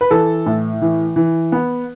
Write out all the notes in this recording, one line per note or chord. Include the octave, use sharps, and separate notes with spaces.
B4
E3 A4
A2
E3
E3
B3